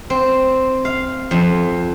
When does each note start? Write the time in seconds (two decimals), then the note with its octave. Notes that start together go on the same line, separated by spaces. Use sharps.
0.10 C4
0.85 F5
1.31 F2